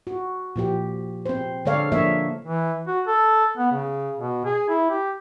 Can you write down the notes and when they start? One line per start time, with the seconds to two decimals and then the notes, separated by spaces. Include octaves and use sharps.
0.07 F#4
0.56 A#2 F3 G4
1.26 C4 C5
1.65 D3 G#3 A4 C#5 D5 F5
1.92 F3 A#3 D4 C#5 D#5 E5
2.45 E3
2.87 F#4
3.07 A4
3.58 B3
3.72 C#3
4.18 B2
4.45 G#4
4.69 E4
4.90 G4